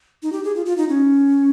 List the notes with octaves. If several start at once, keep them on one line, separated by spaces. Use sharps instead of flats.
D#4
G4
G#4
F4
F4
D#4
C#4